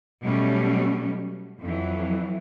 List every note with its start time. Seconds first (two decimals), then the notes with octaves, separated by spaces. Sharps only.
0.22 B2 F#3 G3 A3 C#4
1.62 F2 E3 F#3